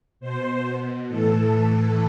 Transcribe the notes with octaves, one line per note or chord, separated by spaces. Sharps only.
B2 C5
B2
A2 E3 A4
A2 E3 A4